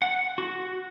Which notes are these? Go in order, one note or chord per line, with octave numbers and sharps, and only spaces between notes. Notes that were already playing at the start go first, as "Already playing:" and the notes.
F#5
F#4